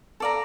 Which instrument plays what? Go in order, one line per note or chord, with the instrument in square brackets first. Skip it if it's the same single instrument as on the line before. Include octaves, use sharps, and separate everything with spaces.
[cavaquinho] A4 D5 F5 A#5